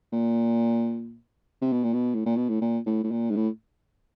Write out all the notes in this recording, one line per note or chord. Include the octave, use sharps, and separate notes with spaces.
A#2
C3
B2
A#2
B2
A2
A#2
B2
A2
A#2
A2
A2
A#2
G#2
A2